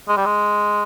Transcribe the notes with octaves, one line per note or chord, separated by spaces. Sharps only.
G#3
G3
G#3